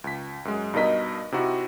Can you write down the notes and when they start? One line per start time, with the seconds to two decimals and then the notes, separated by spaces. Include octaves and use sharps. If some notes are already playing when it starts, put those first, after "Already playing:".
0.04 C#2 B6
0.45 F#2 G#3
0.74 G2 B2 D#4 A#4 D#5 B6
1.32 C3 D#4 E4 F#4